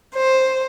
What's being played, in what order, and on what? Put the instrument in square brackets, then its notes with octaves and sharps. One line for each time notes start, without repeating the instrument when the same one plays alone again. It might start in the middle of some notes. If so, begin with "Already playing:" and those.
[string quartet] C5